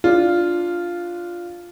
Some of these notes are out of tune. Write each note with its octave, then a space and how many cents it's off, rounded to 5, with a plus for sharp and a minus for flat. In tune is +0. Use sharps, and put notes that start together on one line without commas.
D4 +0 F4 +0